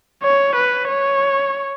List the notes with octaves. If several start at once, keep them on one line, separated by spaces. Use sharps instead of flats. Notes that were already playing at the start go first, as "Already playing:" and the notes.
C#5
B4
C#5